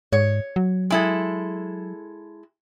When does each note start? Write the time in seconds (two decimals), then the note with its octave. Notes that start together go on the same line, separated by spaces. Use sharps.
0.12 G#2 C#5
0.56 F#3
0.90 G#3 E4 A4